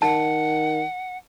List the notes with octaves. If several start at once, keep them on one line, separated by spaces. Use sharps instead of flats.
D#3 F#5 A5